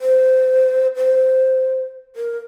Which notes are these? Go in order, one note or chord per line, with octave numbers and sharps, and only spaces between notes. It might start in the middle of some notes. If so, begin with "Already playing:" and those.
C5
C5
A#4